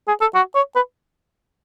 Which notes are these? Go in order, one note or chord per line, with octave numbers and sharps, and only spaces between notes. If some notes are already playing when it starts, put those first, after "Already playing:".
G#4
A4
F#4
C#5
B4